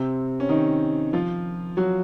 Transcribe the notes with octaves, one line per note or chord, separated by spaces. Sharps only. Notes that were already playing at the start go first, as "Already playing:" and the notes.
Already playing: C3 C4
C#4
D#3 D#4
F3 F4
F#3 F#4